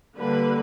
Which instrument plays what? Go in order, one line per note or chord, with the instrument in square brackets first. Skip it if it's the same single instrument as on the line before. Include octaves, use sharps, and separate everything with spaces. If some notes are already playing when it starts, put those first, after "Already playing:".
[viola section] D3 G3 A#3 B4